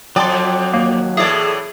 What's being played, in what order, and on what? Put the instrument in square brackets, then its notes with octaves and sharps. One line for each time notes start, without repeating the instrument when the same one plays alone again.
[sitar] F2 D5 [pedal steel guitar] F#3 A5 C6 [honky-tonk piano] G5 D#6
[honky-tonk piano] D#2 [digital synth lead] A#3
[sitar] A2 E3 D5 [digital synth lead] G#4 [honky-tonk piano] A4 E5